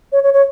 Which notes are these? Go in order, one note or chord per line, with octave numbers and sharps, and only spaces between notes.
C#5
C#5
C#5